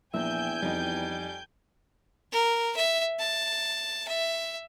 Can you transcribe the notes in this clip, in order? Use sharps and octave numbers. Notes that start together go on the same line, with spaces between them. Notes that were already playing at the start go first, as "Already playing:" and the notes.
A#1 E2 E5 G5 G#5 G6
F2 G3 D#4 D#5
A#4
E5
A5
E5